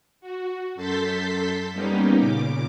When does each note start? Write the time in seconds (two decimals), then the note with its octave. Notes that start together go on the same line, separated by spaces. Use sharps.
0.21 F#4
0.75 F#2 A4 C6 G6 A6 B6
1.72 G3 A#3 B3 C#4 D#4 G4
2.17 A#2 C#3 D6